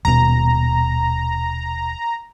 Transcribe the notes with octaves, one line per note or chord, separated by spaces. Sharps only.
D#1 B2 A#5